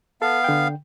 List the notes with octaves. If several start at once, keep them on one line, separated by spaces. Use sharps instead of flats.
B3 A4 F5
D3 G5